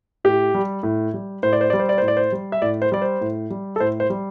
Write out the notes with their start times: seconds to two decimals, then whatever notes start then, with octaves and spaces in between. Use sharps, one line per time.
0.24 A2 G4
0.54 G3
0.83 A2
1.14 G3
1.43 A2 C5
1.53 D5
1.61 C5
1.70 G3 D5
1.79 C5
1.89 D5
1.98 A2 C5
2.08 D5
2.17 C5
2.32 G3
2.52 E5
2.62 A2 D5
2.82 C5
2.92 G3 D5
3.02 C5
3.21 A2
3.50 G3
3.76 A4
3.80 A2 C5
4.00 C5
4.10 G3